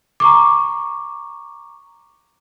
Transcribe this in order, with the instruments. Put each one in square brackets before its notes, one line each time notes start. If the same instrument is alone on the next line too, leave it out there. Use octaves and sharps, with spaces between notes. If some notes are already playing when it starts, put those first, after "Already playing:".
[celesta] A#5 C#6 D6